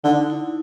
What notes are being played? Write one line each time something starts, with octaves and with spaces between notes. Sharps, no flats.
D3 D#4
E4